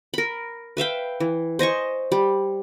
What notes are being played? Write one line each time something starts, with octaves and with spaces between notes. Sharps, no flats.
A#4 B5
B4 E5 F5 G5
E3
C5 D#5 G#5 C#6
G3